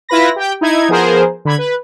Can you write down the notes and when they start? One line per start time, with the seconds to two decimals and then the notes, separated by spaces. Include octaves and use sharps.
0.09 E4 F4 B4 B5 A#6
0.36 G4 G5
0.61 D#4 E4 G#6
0.89 F3 B3 G#4 A#4 C5
1.45 D3 B5 G#6
1.58 B4